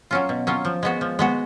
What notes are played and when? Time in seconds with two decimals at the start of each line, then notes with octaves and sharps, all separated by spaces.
0.11 F#3 C#4 F4
0.29 B2
0.47 F#3 C#4 F4
0.65 F3
0.83 G#3 B3 F#4
1.01 F3
1.19 G#3 B3 F#4